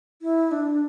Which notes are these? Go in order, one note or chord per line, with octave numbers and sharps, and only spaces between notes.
E4
D4